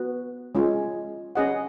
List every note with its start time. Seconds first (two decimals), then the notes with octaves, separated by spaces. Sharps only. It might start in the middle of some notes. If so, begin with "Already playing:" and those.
Already playing: B3 F#4
0.55 G#3 C#4 F4
1.35 C#4 G#4 D#5 F#5